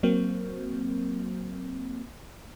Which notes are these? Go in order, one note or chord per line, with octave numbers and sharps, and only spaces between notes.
F#3 A#3 C4